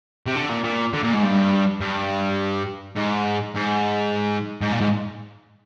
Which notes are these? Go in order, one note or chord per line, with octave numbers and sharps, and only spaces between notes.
C3
D3
A#2
A#2
D3
A#2
G#2
G2
G2
G#2
G#2
G#2
A#2
G#2